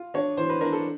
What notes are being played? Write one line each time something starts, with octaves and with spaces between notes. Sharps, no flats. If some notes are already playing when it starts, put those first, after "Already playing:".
Already playing: F4
D4 C#5
E3 C5
B4
D4 A#4
A4